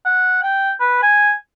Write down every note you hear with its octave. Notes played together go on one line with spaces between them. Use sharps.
F#5
G5
B4
G#5